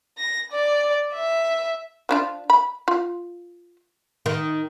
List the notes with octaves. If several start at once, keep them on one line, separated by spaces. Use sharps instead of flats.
A#6
D5
E5
F3 D4 F4
B5
F4
D#3